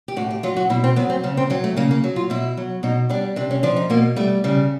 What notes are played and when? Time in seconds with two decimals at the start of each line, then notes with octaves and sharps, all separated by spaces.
0.08 G4
0.17 A2 F#4
0.31 G4
0.43 F#3 F4
0.57 F#4
0.70 B2 E4
0.84 C4
0.96 F#3 B3
1.10 C4
1.24 C#3 C#4
1.37 C4
1.50 F#3 C4
1.64 A3
1.77 C#3 A#3
1.91 A#3
2.04 F#3
2.16 F4
2.30 B2 E4
2.57 F#3
2.83 B2 D#4
3.09 G3 D4
3.36 C3 D4
3.51 C#4
3.63 F3 D4
3.76 D#4
3.90 B2 A#3
4.16 G3 A3
4.44 C#3 G3